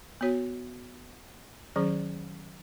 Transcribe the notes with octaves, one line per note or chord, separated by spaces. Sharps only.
B3 F#4 C#5
D#3 F#3 C#4 G#4